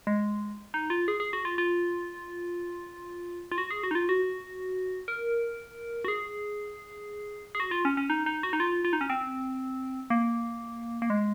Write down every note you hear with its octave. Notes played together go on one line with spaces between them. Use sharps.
G#3
D#4
F4
G#4
G#4
F#4
F4
F4
F4
F#4
G#4
F#4
D#4
F4
F#4
A#4
F#4
G#4
G#4
F#4
F4
C#4
C#4
D#4
D#4
F#4
D#4
F4
F4
D#4
C#4
C4
A#3
A#3
G#3